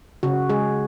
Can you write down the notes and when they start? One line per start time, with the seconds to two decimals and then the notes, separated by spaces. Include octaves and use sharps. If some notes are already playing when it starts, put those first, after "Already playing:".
0.23 C#3 F#4
0.49 G#3 G#4